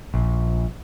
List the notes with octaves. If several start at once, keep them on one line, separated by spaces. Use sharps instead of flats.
A#1